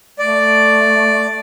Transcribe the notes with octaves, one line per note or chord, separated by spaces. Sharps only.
A3 D5